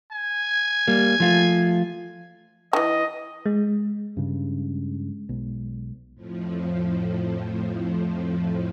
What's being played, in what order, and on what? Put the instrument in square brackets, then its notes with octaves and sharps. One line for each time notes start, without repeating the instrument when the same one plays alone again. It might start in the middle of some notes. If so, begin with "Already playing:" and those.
[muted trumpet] G#5
[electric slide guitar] G3 A#3
F3 A3 F4
[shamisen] D3 E3 [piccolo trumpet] D#5
[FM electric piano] G#3
[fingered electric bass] G2 C#3
B1
[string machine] F2 A2 F3